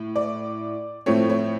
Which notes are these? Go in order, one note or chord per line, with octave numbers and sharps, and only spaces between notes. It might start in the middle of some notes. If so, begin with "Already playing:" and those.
Already playing: A2
D5
A2 F3 A3 C4 C#5
C#5